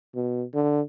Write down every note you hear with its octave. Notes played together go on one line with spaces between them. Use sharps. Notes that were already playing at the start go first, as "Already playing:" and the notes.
B2
D3